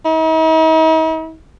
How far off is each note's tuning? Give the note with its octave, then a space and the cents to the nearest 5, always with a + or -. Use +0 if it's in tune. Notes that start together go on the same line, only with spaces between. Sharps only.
D#4 +45